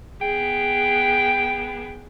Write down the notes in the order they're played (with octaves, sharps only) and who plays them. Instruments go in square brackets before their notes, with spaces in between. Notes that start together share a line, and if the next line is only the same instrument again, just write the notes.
[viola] B3 G#4 [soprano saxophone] G5